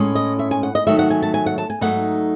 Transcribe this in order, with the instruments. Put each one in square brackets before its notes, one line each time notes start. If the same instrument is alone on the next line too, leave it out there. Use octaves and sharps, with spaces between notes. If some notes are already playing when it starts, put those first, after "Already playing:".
Already playing: [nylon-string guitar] A2 G#3 C#4
D#5
E5
G#5
F#5
D#5
D#3 F#3 A3 E5
F#5
G#5
A5
G#5
F#5
A5
G#5
G#2 F#3 A3 D#4 F#5